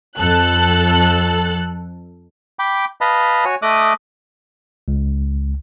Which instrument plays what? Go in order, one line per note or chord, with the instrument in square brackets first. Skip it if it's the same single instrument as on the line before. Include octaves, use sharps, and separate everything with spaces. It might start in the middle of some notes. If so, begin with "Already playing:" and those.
[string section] F2 A4 F#6
[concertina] G5 B5 D6
B4 D#5 F5 A5 B5
F#4 C#5 G#5
A3 D#5 D6 D#6 F#6
[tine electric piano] C#2